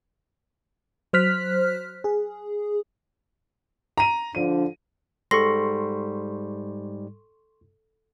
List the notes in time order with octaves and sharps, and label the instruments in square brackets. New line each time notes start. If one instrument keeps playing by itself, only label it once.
[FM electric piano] F#3 C5 F6 F#6 B6
G#4
[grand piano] A#5 D#7
[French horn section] D3 F3 D4 [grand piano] D#7
[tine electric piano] G#2 G3 [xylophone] A4 A#6 [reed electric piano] C6 C#6